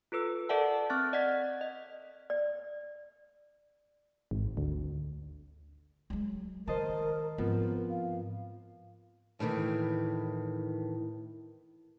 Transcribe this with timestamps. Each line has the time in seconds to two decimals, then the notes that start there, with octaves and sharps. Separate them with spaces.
0.12 F4 A4 B4 E6
0.49 A4 A#4 D5 E5 F#5 A5
0.90 C4 C#6 F6 F#6 A6
1.13 D5 D#5 F#5 G#6 B6
1.61 D#5
2.30 D5
4.31 G#1
4.57 D2
6.10 F#3 G#3
6.67 D#3 A#4 C5 D#5 A5
7.38 G#2 F3 B3 C4 A#4
7.90 F5
9.39 D#2 A2 C3 D#3 E3